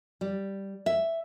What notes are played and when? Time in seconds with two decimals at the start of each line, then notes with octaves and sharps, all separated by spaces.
0.21 G3
0.86 E5